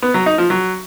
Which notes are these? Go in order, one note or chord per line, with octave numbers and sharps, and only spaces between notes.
B3
F#3
D#4
F3
F#3